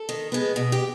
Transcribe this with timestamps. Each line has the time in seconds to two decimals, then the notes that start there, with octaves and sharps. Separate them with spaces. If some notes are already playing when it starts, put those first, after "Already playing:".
Already playing: A4
0.09 D#3
0.32 G#3 B3
0.56 B2
0.72 G4